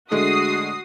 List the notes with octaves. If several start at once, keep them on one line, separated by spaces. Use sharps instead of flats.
D3 G#3 A3 F#4 D#6 C7